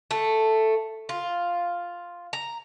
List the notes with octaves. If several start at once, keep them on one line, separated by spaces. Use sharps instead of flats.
A3
F4
A#5